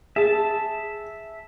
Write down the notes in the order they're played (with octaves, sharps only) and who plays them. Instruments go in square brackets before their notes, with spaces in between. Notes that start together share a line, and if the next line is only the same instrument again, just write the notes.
[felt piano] G#4 [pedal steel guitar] E5 A5